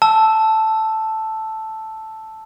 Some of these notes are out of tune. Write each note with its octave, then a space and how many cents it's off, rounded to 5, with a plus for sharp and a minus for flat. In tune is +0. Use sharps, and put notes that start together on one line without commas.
A5 +0 E6 +0